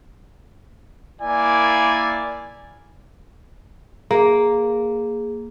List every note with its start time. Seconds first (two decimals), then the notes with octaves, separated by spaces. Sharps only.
1.21 A#3 E4 D5 G#5
4.11 A#3 G#4